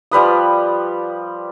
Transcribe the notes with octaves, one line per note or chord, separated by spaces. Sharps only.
F3 G3 B4 D#6